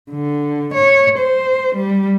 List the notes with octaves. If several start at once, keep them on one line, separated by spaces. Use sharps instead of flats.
D3
C#5
C5
G3